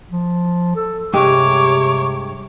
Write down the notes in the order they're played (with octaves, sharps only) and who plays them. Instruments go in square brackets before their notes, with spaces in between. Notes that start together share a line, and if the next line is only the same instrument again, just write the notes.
[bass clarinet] F3
A4
[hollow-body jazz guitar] G2 G#3 G4 [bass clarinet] C3 [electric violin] C#5 D6